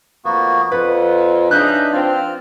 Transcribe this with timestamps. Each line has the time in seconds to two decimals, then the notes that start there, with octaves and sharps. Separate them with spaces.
0.25 F2 A#3 B3 F#4
0.72 F2 F4 B4 F#5
1.51 C#3 D4 D#4 E5 F#6 G6
1.92 F3 C4 F4 F6